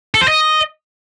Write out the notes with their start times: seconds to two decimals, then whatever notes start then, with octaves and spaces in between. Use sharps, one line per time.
0.14 A4
0.21 C5
0.28 D#5